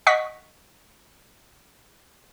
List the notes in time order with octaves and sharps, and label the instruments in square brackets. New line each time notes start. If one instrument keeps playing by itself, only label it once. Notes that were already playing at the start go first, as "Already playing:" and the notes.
[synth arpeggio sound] D#5 F#5 C#6 B6